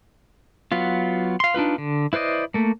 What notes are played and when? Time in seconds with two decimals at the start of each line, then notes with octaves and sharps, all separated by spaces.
0.72 F#3 B3 F4
1.40 F5 C6
1.54 D4 D#4 F4 B4
1.78 D3
2.13 E4 B4 C5 D5 D#5
2.54 A3 A#3